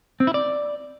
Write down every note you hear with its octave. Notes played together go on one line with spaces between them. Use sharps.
C4
E4
D5